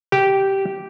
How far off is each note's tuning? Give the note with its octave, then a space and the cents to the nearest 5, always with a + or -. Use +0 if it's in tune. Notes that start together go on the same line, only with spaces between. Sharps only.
G4 -10